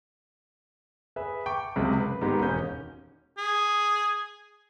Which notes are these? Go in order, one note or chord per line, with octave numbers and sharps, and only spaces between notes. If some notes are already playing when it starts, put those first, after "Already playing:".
G#4 B4 E5
G5 A5 C#6 D6
C#2 F#2 C3 G#3
B4
G#2 D#3 B3 G4
E1 D#2 C#4 G6
G#4